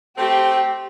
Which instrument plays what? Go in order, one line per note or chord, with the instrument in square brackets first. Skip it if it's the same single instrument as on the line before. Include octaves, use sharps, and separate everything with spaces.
[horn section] A3 C4 [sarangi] G4